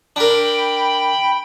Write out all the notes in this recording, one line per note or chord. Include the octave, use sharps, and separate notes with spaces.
D4 A#4 G5 B5